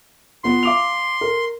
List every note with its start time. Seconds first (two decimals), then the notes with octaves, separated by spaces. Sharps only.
0.44 B3 F4 C6
0.63 F5 D6 F7
1.21 A#4